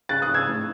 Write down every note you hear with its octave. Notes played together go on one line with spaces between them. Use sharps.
C#3 F#6 A6
D#6 F#6
C#3
E6 G#6
A2